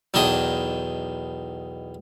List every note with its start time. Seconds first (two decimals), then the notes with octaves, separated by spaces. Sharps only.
0.14 B1 E2 D#3 D4 D#5